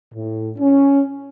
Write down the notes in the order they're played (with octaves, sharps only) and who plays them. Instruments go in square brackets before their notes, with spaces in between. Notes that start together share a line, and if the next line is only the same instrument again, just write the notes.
[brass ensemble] A2
C#4